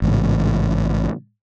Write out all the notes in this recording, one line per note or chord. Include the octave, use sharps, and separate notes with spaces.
A1 G#2 C#3